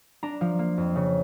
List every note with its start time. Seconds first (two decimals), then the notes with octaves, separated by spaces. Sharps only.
0.23 D4 A#5
0.41 F3
0.59 A#3
0.78 F2
0.95 C#3